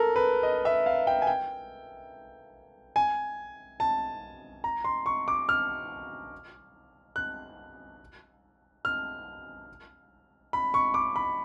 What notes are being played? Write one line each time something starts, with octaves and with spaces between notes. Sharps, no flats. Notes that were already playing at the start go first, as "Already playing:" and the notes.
Already playing: A4 A#4
B4
D#5
E5
F5
G5
G#5
G5
G#5
A5
A#5
C6
C#6
D6
F6
F#6
F6
B5
C#6
D6
B5